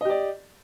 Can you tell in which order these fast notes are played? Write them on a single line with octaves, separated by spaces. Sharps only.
D#5 G4 D5